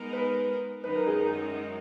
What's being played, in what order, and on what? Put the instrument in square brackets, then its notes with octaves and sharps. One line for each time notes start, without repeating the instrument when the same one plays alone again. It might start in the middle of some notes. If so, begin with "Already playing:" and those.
Already playing: [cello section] G#3 B3 D#4 A#4
[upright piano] B4
[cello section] F#2 D#3 G#3 D#4 [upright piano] B4
[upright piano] A#4
G#4
A#4